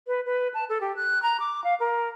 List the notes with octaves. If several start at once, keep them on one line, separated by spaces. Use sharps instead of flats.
B4
B4
A5
A4
G4
F#6
A#5
D6
F5
A#4